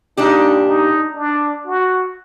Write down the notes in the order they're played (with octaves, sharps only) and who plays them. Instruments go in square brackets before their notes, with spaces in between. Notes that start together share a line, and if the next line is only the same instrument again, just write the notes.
[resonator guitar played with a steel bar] A#2 G3 D4 G4 [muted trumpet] D#4
[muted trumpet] D#4
D4
F#4